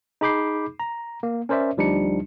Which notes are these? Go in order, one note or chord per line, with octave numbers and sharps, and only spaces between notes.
D#4 G#4 B5 D6 G6 C7
A#5
A#3
C#4 A#4 C5 D5 E5
D2 F3 G3 D4 D#4 C#7